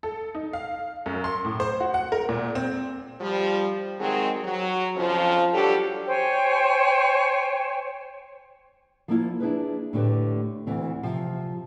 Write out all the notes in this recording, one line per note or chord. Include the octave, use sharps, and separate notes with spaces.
A4
D#4
F5
F#2
C6
A2
C5
F#4
F#5
A#4
A#2
C4
F3 G3
D#3 F#3 G#3 C4 G#4
F#3
F2 C#3 F3
F#3 G3 D4 G4 A4
C5 C#5 G5 G#5
F3 A#3 E4 F4
D4 E4 G#4 B4
A2 D3 G4 B4
D2 E3 C4
C3 F3